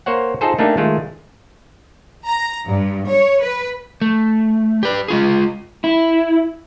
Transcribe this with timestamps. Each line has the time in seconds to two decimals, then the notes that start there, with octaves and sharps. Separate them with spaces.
0.06 A#3 C5 C#5 F#5
0.41 D#4 F4 G#4 A4 C5
0.59 A3 A#3 D4 D#4 G4
0.77 D#3 G#3 A3 F4
2.26 A#5
2.67 G2
3.10 C#5
3.42 B4
4.01 A3
4.83 G4 B4
5.08 G#3 F4 G#4
5.84 E4